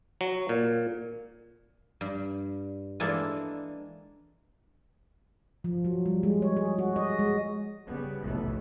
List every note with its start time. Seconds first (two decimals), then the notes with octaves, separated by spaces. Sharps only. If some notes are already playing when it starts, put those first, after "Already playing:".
0.21 F#3
0.49 A#2
2.01 G2
3.00 E3 G#3 A#3 D4 A4
5.64 F3
5.85 F#3
6.06 G3
6.23 G#3
6.42 C#5
6.57 G#4
6.78 F#4
6.96 D#5
7.19 G#3
7.87 C#3 G3 B3
8.22 F1 B1 A2 E3 A3 B3